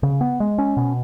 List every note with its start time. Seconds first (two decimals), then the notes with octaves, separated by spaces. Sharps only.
0.03 C#3
0.21 B3
0.40 G#3
0.58 C#4
0.77 B2